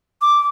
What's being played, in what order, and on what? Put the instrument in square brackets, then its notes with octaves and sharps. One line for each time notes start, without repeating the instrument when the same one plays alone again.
[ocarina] D6